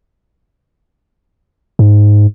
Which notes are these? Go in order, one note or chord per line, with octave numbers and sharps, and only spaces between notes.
G#2